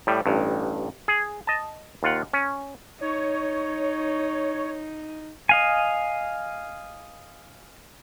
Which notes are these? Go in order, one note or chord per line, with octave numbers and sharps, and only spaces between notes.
A2 G3
A1 G2
G#4
D#5 A5
D#2 F4 F#5
C#4
D#4 C#5
D#5 F5 G#5